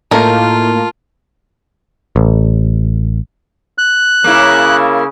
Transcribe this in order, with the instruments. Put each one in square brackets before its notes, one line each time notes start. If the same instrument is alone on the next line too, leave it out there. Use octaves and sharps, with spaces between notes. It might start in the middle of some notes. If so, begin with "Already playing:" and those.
[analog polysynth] A2 A#3 [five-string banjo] A3 D#4 A#4 [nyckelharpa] F4 [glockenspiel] A5
[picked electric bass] A1
[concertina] F#6
[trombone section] C#3 [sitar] A#3 E4